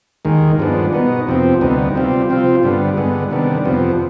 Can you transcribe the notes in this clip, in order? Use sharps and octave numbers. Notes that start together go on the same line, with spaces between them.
D#2 D#3 G#3
G2 F3 G#3 B3 D4
B2 B3 D#4
F2 C3 F3 C4
D2 C3 G3 B3 D#4
C3 G3 C4 F4
C3 F3 C4 F4
G2 D3 G3 B3
G2 D3 G#3 B3
C3 D#3 G3 B3 D4
F2 C3 F3 B3